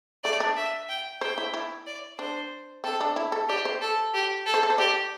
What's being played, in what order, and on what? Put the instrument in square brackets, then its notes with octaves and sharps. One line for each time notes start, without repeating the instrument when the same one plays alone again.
[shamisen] A3 [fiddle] D5
[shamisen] D4
[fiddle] E5
G5
[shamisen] C5 [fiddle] G5
[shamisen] E4
E4
[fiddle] D5
[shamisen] D4 [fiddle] C5
[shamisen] C4 [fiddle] A4
[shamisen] D4
E4
A4
[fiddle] G4 [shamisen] D5
[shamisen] C5
[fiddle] A4
G4
A4
[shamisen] C5
A4
C5
[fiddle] G4 [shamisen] D5